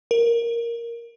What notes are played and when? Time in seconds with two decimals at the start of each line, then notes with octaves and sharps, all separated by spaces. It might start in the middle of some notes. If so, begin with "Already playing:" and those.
0.11 A#4